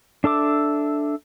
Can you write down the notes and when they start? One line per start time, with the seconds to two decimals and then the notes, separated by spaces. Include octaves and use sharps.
0.24 D4 A4 E5 D6